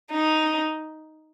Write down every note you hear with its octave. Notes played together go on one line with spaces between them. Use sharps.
D#4